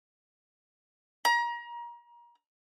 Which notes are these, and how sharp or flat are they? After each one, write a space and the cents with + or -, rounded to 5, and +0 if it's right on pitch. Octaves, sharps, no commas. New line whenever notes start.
A#5 +30